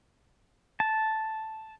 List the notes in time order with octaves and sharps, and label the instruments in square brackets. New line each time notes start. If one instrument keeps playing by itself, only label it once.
[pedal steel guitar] A5